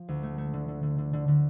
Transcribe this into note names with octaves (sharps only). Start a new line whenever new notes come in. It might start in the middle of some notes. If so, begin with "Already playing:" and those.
Already playing: F3
D2
A3
A3
D3
D3
D3
D3
D3
D3